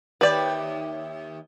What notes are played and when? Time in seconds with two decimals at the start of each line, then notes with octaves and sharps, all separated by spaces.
0.21 D#2 G4 B4 D5 E5